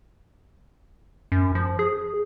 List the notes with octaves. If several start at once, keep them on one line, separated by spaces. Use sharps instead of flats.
F#2
F3
G#4